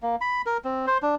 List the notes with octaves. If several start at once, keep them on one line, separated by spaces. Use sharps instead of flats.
A#3
B5
A#4
C4
C5
D4